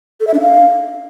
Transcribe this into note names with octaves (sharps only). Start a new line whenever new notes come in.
A4
E5
D4
F5